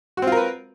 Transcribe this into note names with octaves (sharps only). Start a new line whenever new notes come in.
C4 F4 F#4 A#4 B4